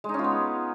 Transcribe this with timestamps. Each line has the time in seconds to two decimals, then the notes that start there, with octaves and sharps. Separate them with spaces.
0.04 G#3
0.09 D#4
0.14 C#4
0.19 F4
0.24 B3